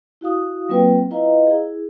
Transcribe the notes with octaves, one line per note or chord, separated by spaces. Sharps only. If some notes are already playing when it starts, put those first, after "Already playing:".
E4 F#4 F5 D#6
F#3 A#3 C4 F4 B4 G5
E4 F4 B4 D#5 F5 A#5
E4 G#4